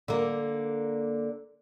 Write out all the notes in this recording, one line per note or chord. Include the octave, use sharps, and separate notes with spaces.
D3 A#3